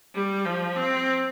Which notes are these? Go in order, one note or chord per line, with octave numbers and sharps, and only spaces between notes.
G3
F3
C4